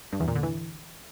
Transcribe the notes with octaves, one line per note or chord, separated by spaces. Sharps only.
G2
E2
A#2
D3
E3